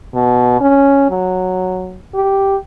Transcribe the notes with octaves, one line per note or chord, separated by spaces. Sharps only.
B2
C#4
F#3
G4